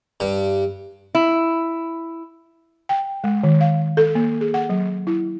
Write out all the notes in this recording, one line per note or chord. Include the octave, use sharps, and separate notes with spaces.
G2
E4
G5
G#3
D#3
F5
A4
A#3
G#4
F#5
F#3
E4